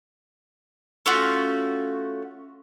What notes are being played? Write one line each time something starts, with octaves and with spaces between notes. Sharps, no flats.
A3 C#4 F4 F#4